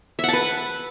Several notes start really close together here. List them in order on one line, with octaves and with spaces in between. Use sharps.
E5 F#5 A5 B4